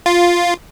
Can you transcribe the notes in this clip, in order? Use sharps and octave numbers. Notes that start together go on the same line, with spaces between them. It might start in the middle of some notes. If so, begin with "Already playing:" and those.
F4